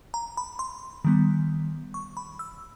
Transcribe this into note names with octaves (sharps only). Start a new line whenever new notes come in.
A#5
B5
C6
D#3 G3 B3
C#6
B5
E6